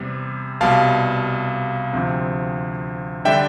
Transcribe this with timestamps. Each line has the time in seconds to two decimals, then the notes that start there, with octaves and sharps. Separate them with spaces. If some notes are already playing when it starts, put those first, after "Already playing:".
Already playing: E2 C3 G3
0.61 C2 B2 G3 F5 A5
1.93 D2 C3 F3 C4
3.25 D3 G3 D4 E5 G5